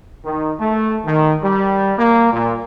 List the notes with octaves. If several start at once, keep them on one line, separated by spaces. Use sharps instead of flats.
D#3
A3
D#3
G3
A#3
A#2